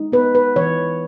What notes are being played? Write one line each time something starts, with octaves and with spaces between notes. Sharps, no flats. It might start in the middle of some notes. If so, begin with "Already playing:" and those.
Already playing: G#3 D#4
B3 B4
B4
E3 C#5